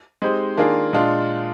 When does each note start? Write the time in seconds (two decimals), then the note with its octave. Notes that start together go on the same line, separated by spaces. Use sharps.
0.22 G#3 C4 D#4 G4 C5
0.57 D#3 A#3 D4 F4 G#4
0.93 A#2 G#3 D4 F4